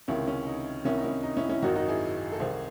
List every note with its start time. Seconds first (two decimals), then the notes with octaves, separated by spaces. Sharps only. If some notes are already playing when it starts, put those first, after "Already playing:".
0.08 C#2 C3 D#3 C#4 E4
0.28 C#4
0.46 D#4
0.85 C2 C3 D#3 C#4 E4
0.98 D#4
1.04 C#4 E4
1.23 D#4
1.37 C#4 E4
1.49 C#4 E4
1.62 G#1 F#2 D#3 D#4 F#4
1.75 D#4 F#4
1.88 E4 G#4
2.32 A4
2.40 C2 C3 D#3 G#4 C5